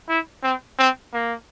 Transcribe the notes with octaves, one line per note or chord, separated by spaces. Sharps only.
E4
C4
C4
A#3